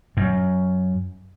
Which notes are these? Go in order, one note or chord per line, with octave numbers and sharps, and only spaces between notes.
F#2